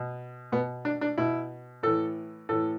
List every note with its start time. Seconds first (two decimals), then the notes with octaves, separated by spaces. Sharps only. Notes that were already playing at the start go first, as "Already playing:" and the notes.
Already playing: B2
0.52 B2 B3
0.85 D4
1.01 D4
1.18 B2 E4
1.83 A2 E3 A4
2.49 A2 E3 A4